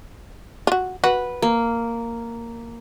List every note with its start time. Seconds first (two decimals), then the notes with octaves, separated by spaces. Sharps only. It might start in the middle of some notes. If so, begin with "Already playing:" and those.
0.67 F4 F#4
1.04 F#4 B4
1.42 A#3